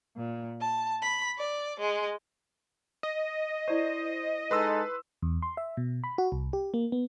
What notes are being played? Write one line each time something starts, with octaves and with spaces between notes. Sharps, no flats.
A#2
A5
B5
D5
G#3
D#5
E4 C5 D5 C#6
G#3 D#4 A4 B4 C6 E6
E2
C6
E5
B2
B5
F#4
C2
G4
A#3
B3